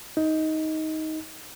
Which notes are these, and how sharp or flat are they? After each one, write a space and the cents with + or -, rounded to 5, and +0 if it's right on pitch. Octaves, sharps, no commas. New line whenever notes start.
D#4 +15